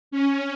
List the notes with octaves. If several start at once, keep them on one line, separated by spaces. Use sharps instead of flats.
C#4